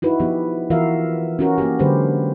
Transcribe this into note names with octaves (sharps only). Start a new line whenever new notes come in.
D#4 E4 F#4 B4
F3 B3 G4
E3 F4 F#4 A#4 E5 F5
C#4 F#4 A#4
A#3 F#4 G4
D3 F#3 G#3 G4 B4 C5